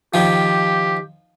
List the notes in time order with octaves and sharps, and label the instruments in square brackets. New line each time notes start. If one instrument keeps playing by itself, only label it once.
[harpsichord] D#3 F3 [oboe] G4